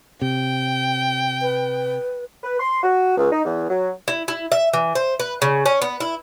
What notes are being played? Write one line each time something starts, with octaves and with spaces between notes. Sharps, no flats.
C3 G5
B4
B4
C6
F#4
C#2
D#4
E2
F#3
E4
E4
E5
E3
C5
B4
C#3
C#4
B3
E4